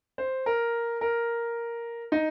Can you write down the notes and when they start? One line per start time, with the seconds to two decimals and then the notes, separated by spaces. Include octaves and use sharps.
0.18 C5
0.46 A#4
1.01 A#4
2.12 D#4